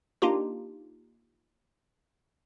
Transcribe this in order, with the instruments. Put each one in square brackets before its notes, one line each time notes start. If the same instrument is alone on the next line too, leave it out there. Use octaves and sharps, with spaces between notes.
[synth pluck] A#3 D4 D#4 F4 G4